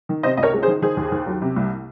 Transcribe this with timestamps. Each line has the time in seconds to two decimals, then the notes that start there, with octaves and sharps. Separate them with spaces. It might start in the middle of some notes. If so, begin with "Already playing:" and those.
0.09 D#3
0.23 C3 C5 D#5
0.37 C#2 D#5
0.43 A#4 C#5
0.53 G#3
0.63 G#4 C5
0.68 D#3
0.82 D#3 G#4 C5
0.97 D#2
1.12 D#2
1.26 F#3
1.42 C3
1.56 C2